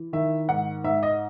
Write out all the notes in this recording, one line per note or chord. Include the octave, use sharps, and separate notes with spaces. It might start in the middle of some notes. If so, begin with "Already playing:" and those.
Already playing: E3
D#3 E5
G#2 F#5
G#2 E5
D#5